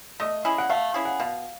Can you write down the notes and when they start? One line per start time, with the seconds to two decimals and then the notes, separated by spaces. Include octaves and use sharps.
0.20 A3 D#5
0.45 C#4 E4 G#4
0.58 F#5
0.69 A3 F5
0.94 C#4 E4 G#4
1.05 F#5
1.20 B2 F5